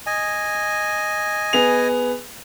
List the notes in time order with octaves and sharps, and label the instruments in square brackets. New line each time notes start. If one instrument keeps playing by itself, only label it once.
[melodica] D#5 G#5
[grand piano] B3 G#4 F7